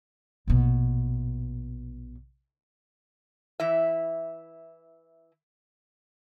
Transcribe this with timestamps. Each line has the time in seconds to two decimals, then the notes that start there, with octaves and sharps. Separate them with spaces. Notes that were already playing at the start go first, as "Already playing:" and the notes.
0.48 A#1 B2
3.60 E3 E4 E5